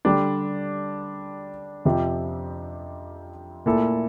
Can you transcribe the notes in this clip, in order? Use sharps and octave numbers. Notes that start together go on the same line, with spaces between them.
D3 G3 D4 G4
F2 C3 F3 C4 G4
A#2 A3 E4 A4